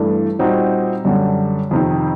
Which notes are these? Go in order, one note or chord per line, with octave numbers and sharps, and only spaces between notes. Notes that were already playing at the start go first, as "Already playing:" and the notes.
Already playing: G2 E3 A3 D4
A#2 G3 C4 D#4 F#4
F#2 D3 G3
F2 C3 D#3